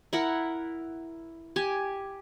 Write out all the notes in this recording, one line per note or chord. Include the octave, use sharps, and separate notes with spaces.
E4 A#4 F#5
G4 G#5